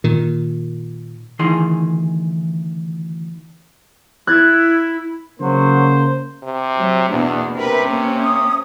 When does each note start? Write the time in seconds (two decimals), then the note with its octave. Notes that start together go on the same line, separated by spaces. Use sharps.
0.04 A#2 D#3
1.39 D2 D#3 E3 G#4 D#5 C6
4.27 E4 F#6 G#6 A6
5.39 C#3 F#3 A#3 C5
6.43 C3
6.75 F#3
7.10 E2 B2 A#3 D4
7.55 C3 A#4 B4
7.87 A#3 C#4
8.24 D#6